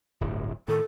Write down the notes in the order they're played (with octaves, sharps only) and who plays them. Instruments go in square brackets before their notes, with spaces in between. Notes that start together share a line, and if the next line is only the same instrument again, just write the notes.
[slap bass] D1 G1 A2
[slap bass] A2 D#3 [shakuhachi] A4